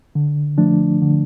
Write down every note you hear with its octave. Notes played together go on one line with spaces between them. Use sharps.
D3
F3 A3 D4
D3